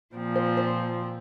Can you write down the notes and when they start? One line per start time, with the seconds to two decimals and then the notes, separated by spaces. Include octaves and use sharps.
0.15 A#2 F3 C4
0.36 C5
0.57 C5